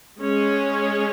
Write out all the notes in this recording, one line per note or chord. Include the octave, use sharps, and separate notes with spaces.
G#3 C#4 G#4 C#5